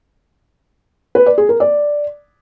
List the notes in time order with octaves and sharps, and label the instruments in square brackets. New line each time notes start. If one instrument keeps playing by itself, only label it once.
[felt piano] B4
D5
G#4
A#4
D5